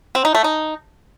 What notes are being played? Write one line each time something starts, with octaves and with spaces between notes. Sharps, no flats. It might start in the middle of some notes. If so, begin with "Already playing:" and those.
C4
D#4
A3
D#4